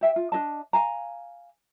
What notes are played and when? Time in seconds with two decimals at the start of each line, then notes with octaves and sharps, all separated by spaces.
0.01 G4 E5 G5
0.16 F4
0.32 D4 G#4 D#5 A5
0.73 F5 G#5 A#5